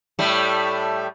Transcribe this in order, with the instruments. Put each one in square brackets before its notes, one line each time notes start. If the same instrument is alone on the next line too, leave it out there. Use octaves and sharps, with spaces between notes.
[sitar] A2 G3 A3